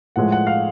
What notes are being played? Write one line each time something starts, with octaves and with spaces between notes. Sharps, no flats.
A2 F3 G#3 F#5
F#5
F5